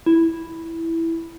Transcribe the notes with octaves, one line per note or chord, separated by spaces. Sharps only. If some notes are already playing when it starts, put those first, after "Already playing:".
E4